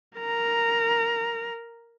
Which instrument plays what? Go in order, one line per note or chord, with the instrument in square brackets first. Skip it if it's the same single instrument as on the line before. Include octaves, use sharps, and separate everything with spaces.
[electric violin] A#4 A#5